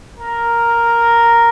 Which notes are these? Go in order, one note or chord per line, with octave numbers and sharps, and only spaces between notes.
A#4